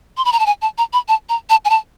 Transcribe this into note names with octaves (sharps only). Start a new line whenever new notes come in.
C6
B5
A#5
A5
G#5
A5
A#5
B5
A5
A#5
A5
G#5
A5